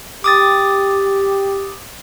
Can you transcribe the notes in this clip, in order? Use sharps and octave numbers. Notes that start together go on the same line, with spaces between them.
G4 D6 D#6 A6